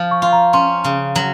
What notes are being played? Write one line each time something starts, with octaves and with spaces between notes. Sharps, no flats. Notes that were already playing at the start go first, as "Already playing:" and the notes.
Already playing: F3
C#6
F4
A#5
C#4 C6
C#3
F#3